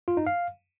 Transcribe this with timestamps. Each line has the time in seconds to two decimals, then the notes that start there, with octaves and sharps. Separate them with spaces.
0.08 F4
0.17 D#4
0.27 F5